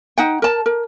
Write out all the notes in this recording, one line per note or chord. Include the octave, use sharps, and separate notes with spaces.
D#4 F#5 G5
A#4 A5
A#4